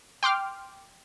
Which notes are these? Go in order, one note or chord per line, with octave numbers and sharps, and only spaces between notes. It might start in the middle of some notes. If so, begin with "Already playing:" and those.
G5 C6 D6 F6